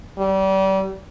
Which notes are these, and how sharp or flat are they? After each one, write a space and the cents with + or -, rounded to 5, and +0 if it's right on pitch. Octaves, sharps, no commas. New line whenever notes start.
G3 -30